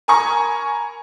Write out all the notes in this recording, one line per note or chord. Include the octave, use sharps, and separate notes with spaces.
A#4 G#5 A#5 B5 C#6